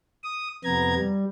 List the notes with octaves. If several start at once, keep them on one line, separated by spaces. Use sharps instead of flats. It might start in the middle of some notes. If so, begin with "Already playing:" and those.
D#6
F2 C3 B3 A#5 G#6
G3